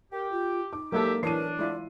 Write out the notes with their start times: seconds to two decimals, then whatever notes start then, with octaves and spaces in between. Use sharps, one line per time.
0.12 G4 A#4
0.32 F4
0.73 D#4 D6
0.92 D2 F#3 G#3 A#3 G4 A4 E5
1.23 E3 D4 A#4 C#5 C7 D#7
1.59 G#3 E4 F4 D5